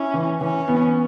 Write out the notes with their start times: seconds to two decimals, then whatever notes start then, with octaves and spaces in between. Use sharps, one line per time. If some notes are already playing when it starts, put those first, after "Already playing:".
Already playing: C#4 E4
0.14 E3
0.41 E3 C#4
0.68 B3